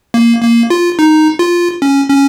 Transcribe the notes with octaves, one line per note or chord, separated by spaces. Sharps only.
A#3
A#3
F4
D#4
F4
C#4
C#4